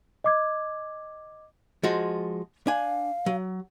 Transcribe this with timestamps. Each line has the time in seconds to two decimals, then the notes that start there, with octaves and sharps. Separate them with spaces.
0.24 D#5 D6 G#6
1.83 F3 G#3 F#4
2.67 D4 F5 G#5
3.26 F#3